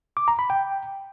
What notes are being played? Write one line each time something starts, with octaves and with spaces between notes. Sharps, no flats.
D6
A#5
B5
G5